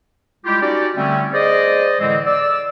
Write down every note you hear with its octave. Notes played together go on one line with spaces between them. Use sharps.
G3 G#3 E4 F4 G4
C#4 D#4 F#4 G4 D5
D3 G3 A3 C4 C#4
G#4 C5 D5 D#5
A2 D3 E3 G#3 C4
D5 E6